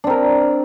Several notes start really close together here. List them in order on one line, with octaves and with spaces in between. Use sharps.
D4 C4 A#4